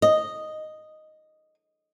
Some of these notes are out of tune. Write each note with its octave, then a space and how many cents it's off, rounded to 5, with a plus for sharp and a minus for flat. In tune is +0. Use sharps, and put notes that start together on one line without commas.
D#5 -5